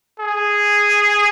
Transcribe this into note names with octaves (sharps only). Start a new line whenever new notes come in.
G#4